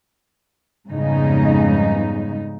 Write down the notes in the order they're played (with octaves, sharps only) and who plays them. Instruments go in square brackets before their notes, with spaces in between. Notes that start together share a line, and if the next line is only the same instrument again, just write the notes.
[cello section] F2 G#2 C#3 G3 B3 D#4